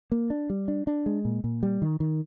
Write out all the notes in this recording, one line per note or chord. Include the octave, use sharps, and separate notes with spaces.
A#3
D4
G3
D4
D4
G#3
A#2
A#2
G3
D#3
D#3